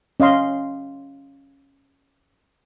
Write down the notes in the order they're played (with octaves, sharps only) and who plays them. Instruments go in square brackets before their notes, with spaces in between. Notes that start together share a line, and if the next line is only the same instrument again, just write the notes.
[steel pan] C#4 D#5 F5 C6